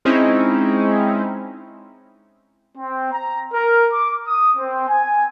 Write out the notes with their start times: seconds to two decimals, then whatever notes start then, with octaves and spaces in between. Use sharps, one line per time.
0.05 G#3 C4 C#4 D#4 E4
2.78 C4
3.12 A#5
3.54 A#4
3.93 D6
4.27 D#6
4.57 C4
4.89 G#5